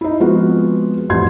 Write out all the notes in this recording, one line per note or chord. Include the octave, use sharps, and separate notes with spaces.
D#4 E4
F3 G#3 B3 C4 F4 F#4
A1 F2 G3 C6 G#6